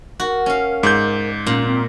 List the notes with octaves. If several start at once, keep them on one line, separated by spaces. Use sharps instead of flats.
F#4 A#4
C#4 F5
G#2 D5 G6
A#2 C#4
C4